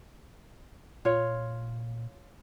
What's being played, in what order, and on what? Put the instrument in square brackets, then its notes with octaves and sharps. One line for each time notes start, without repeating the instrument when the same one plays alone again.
[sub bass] A#2 [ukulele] F4 C#5